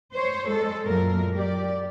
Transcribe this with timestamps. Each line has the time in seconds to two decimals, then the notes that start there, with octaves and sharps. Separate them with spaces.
0.14 C5 C#5
0.49 G#3 A4
0.85 F#2 A#2 A#4
1.34 G4 D5